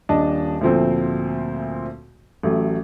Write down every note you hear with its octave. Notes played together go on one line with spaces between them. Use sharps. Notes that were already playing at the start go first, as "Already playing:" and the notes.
D#1 D4 D#5 A5
D2 A#2 F3 A3 C4
A1 F#3 A3